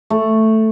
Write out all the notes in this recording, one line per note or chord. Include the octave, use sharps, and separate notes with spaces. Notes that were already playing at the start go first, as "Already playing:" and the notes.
A3